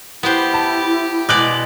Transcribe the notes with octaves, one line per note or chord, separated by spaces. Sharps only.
B3 E4 G4 C5
A5
B2 G#3 D5 D6 F#6 F#7